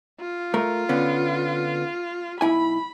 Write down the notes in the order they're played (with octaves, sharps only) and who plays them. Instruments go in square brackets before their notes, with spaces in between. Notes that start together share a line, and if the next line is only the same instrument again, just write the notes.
[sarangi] F4
[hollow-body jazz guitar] A3 A#4
D3 B3 C#4
[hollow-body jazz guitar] B1 E4 G#5 [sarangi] B5